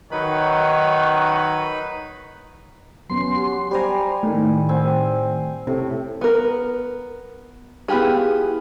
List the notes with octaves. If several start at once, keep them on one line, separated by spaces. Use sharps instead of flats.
D#3 F#3 D#4 B4 C#5 B5
F#3 B3 C#4 C6
G4
G3 G4 C5 G#5 A#5
A2 D#3
C4 G#5
A2 C3
B3 A#4
B3 E4 F4 G4 G#4